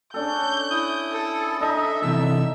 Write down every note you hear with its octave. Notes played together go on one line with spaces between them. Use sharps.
C#4 D4 A4 G6
E4 D#6
A4
D4 D#4 A4 D#5 E5
C3 E3 A4 E6